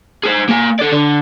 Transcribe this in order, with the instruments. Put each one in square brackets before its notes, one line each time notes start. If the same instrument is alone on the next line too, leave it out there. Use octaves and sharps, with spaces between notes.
[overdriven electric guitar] G#4 C5
A#3 G#5
A4 D5
D3